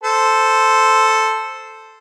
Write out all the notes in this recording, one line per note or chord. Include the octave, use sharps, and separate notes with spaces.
A4 C5